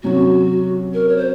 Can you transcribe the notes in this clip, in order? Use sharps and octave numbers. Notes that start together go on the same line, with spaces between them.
C3 F#3 C#4 F#4
A#4
C#5
C5